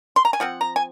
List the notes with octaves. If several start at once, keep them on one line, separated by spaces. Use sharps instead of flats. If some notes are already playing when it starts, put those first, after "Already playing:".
C6
A#5
G#5
F3 C4 F#5
A#5
G#5